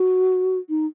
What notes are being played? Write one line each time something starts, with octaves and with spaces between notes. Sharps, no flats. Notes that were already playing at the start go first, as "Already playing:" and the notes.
Already playing: F#4
D#4